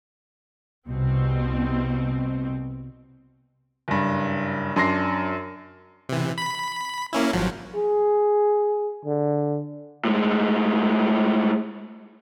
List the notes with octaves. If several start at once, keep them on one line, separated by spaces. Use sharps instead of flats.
C2 B2 C4
F#1 G2
F#2 D4 C6 A#6 C7
C3 E3
B5
A#3 C#4 E4
G#1 F3 F#3
G#4
D3
A2 G#3